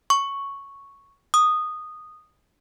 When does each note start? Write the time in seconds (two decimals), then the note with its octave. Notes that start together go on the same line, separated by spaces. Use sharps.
0.10 C#6
1.34 D#6